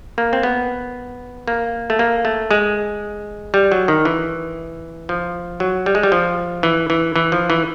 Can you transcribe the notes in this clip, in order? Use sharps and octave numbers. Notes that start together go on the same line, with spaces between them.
A#3
C4
B3
A#3
A3
A#3
A3
G#3
G3
F#3
D#3
E3
F3
F#3
G3
G#3
G3
F3
E3
E3
E3
F3
E3